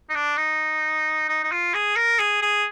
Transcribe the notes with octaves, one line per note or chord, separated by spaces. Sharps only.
D#4
D4
D#4
D#4
D#4
F4
G#4
A#4
G#4
G#4